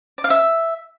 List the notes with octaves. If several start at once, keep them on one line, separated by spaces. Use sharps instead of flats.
D5
F5
E5